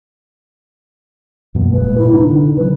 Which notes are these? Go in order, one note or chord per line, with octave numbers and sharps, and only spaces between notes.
F#2 B2 A#3
D#1 A#2 G#3 B4
G2 A#2 E4
C3 D4 D#4
D3
C3 F#3 B4